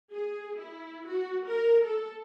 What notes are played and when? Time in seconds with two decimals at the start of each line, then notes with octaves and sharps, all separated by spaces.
0.13 G#4
0.59 E4
1.07 F#4
1.49 A#4
1.85 A4